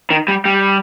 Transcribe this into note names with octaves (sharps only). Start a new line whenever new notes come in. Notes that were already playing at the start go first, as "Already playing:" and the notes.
D#3
G3
G3